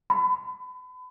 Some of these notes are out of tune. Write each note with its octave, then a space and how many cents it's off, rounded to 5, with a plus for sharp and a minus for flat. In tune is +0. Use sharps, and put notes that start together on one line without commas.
B5 +35